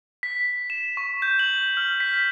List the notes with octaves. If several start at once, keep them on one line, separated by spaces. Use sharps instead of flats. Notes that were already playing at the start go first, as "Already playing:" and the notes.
B6
E7
C#6
G6
F#7
F6
B6